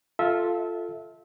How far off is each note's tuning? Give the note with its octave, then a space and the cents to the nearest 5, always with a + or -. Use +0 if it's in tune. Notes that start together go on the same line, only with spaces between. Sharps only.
F4 +0 A4 +0 E5 -25